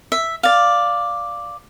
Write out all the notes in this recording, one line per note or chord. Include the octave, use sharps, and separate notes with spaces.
E5
D5 F5